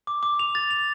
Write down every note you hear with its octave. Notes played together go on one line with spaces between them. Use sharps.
D6
D6
F7
A6
F7